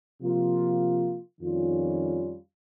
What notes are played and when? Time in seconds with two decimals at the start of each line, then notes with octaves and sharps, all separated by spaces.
0.22 C3 F3 A#3 F4
1.41 F2 D#3 G3 C#4 F4